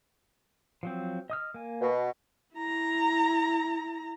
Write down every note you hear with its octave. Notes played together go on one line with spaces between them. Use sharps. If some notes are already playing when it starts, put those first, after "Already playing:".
F3 F#3 C4
D#5 D#6 F6
A#3 G#5
B2
E4 A#5